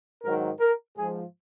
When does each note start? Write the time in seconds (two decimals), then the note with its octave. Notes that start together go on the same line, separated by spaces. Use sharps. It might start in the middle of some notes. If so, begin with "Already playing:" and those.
0.23 G#2 D#3 F#3 A#4
0.60 A#4
0.97 G#2 F3 G#4